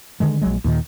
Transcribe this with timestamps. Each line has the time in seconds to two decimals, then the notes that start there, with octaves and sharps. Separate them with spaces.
0.20 D3 D#3 G#3
0.42 A#1 F#3 G#3
0.64 D#2 A#2 D#3